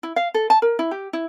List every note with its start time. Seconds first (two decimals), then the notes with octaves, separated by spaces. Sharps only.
0.03 E4
0.16 F5
0.34 A4
0.50 A5
0.62 A#4
0.79 E4
0.91 G4
1.13 E4